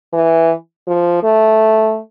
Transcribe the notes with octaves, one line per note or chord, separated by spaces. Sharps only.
E3
F3
A3